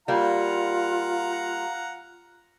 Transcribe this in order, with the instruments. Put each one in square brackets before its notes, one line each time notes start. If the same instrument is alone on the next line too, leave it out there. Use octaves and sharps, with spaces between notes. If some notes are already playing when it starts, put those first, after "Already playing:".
[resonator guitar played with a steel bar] G3 A#3 [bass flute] F4 [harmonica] F5 F#5 A#5